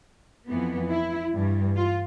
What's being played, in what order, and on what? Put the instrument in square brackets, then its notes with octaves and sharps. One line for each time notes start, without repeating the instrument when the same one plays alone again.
[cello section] F2 E3 B3
E4
G2 E3 G3
F4